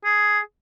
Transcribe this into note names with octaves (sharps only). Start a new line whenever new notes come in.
G#4